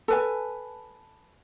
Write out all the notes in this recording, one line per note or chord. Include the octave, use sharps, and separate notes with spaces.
A4 B4 G#5